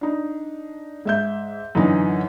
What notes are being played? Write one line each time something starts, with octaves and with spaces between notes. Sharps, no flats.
D4 D#4
G#2 E5 G6
F#2 D3 E3 D#4